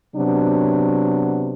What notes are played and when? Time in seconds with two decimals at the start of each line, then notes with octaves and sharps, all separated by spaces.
0.16 C3 F#3 B3 D4 F#4